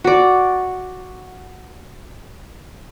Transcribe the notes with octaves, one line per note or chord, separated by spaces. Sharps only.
F#4 D5